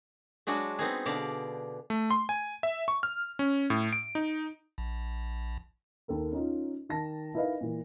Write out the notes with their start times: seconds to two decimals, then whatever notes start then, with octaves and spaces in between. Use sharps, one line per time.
0.47 F#3 G#3 D4 F#4
0.79 B3 C4 D#4 G#4
1.06 B2 D3 D5 F5
1.90 A3
2.11 C6
2.29 G#5
2.63 E5
2.88 C#6
3.03 F6
3.39 C#4
3.70 A2
3.93 D7
4.15 D#4
4.78 A#1
6.08 D#2 A4 A#4
6.33 C#4 D#4 F4
6.89 D#3 D#4 A5 A#6
7.34 D#4 E4 A#4 B4 D#5 F5
7.61 A#2 E3